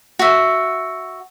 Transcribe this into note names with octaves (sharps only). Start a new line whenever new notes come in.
F#4 E5